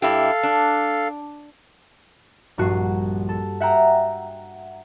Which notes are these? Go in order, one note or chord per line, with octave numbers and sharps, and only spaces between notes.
G2 E4 G4 A4 F5
D4
A#1 G2 F#4 C7
A4
E5 F#5 G5 A#5